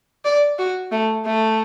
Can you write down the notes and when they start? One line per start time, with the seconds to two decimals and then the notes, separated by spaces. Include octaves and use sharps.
0.25 D5
0.59 F#4
0.92 A3
1.26 A3